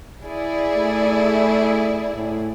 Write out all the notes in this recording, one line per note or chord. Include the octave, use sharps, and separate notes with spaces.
E4 G#4 D5
A3
A2